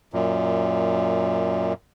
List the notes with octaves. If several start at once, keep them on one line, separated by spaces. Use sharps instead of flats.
F#2 A#2